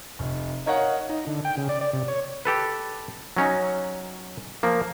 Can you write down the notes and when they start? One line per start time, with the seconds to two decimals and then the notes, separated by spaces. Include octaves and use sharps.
0.19 F1
0.66 D#4 A#4 C#5 D#5 F5 F#5
1.09 D#4
1.27 D3
1.45 G5
1.57 C#3
1.69 D5
1.81 D5
1.93 C3
2.08 C#5
2.45 G4 A4 B4
3.37 F#3 C#4 D#4
4.63 F3 A#3